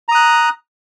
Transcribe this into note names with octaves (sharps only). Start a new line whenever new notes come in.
A#5 D#6 F#6